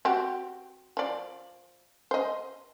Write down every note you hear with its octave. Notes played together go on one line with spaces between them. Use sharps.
C4 F#4 G4
F3 D5
C5 D#5